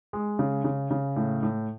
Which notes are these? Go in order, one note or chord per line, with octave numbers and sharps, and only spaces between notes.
G#3
C#3
C#3
C#3
A2
A2